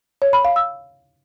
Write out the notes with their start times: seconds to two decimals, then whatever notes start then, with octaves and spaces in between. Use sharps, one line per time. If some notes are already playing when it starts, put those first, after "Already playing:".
0.22 C#5
0.33 B5
0.45 F5
0.56 E6